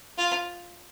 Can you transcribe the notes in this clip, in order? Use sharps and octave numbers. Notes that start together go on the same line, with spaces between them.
F4